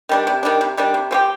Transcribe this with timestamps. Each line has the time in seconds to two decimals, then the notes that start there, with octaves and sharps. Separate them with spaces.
0.09 D#3 G3 D4
0.27 C3
0.43 D#3 G3 D4
0.61 C3
0.77 D#3 G3 D4
0.94 C3
1.11 F3 C4 G4